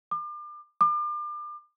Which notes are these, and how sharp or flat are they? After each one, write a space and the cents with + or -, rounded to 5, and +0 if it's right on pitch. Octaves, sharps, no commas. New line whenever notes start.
D6 +35
D6 +35